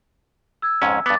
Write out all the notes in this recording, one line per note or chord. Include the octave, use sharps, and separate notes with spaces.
E6 G#6
F2 G#2 C#4
G2 B3 D6 A6